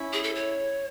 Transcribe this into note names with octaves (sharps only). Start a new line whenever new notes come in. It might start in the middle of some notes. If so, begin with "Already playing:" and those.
Already playing: C#4 E4
G#4
A4
C#5